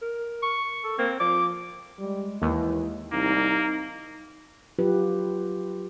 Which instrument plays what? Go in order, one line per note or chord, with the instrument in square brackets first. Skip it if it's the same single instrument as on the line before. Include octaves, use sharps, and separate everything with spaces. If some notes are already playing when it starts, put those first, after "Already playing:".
[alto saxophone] A#4
[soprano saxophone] C#6
[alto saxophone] A4
[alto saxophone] A#3 [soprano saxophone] C4
[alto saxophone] F3 [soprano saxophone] D6
[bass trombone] G3 [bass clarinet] G#3
[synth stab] D#2 [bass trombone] E3
[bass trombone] C2 [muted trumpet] A#3 [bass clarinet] D#4
[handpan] F#3 F4 G4 B4